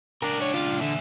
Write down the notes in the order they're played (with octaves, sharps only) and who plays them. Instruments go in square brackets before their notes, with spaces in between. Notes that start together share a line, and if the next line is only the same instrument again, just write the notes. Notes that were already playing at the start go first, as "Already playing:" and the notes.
[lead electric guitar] C#2 D4 [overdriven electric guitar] A#4
[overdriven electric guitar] C#5
F4
[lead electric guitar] A#2 E5 [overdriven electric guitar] D3